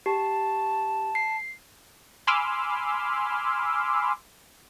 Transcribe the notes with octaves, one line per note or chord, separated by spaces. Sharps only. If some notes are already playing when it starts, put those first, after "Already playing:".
G4 A5
C7
G#5 B5 C6 D6 E6 F6